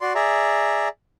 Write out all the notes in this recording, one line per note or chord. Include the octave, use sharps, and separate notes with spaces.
F#4 D5 C6
G#4 D5 E5 A#5